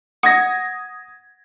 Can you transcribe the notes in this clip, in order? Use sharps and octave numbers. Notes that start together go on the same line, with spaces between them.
F#5 D#6 G#6 A#6